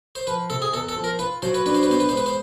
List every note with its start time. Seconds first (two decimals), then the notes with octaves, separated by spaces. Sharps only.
0.15 C5
0.27 F3 B4
0.50 C3 A4
0.62 G#4
0.73 E2 A4
0.89 A4
0.96 F3
1.04 A#4
1.19 F4 B4
1.42 F#3 C5
1.54 B4
1.66 D4 B4
1.75 C5
1.83 B4
1.89 B3 C5
2.00 B4
2.09 C5
2.13 G#3 B4
2.26 C5